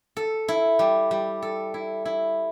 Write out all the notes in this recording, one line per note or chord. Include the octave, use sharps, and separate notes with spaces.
A4
E4
G3
G3
A4
E4
E4